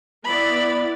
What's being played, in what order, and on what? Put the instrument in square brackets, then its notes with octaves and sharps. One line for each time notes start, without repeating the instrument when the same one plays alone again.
[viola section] B3 E4 D5 [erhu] B5